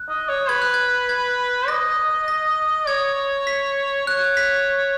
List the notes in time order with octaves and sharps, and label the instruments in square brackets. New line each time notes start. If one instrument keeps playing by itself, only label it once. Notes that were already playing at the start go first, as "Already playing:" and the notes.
Already playing: [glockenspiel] F#6
[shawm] D#5
C#5
[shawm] B4 [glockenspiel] G#6
[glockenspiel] F#6
G#6
G#6
[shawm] D#5 [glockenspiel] A#6
[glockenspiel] A#6
[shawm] C#5 [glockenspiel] G#6
[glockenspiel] B6
[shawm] C#5 [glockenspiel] F#6
[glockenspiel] B6